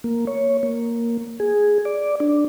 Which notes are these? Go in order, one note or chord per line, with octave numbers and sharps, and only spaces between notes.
A#3
C#5
A#3
G#4
D5
D4